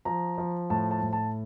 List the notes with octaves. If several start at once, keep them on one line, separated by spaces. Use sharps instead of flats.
F3 A#5
F3
A2 A5
A5
A2
A5